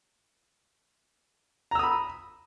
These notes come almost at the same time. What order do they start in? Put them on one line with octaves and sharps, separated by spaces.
A#5 E6 D#6 B5